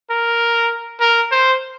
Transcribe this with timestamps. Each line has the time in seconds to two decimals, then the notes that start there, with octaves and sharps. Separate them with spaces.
0.10 A#4
1.01 A#4
1.32 C5